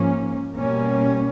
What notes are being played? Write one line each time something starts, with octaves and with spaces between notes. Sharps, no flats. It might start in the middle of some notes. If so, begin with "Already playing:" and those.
Already playing: G#2 F3 A#3 C#4
B2 G3 A#3 C#4